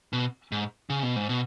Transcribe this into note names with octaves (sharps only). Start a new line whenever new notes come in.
B2
G#2
C#3
B2
G#2
B2